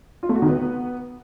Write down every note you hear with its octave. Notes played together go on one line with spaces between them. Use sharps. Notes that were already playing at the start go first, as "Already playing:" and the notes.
F4
A3
F#4
D#3
B3